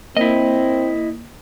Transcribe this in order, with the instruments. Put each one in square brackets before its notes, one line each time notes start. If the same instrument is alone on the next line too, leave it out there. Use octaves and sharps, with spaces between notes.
[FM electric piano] A#3 [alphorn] C4 [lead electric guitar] E4 D#5